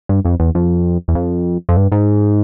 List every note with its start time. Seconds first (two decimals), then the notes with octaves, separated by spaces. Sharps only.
0.09 G2
0.25 F2
0.40 E2
0.55 F2
1.08 E2
1.15 F2
1.69 F2
1.77 G2
1.92 G#2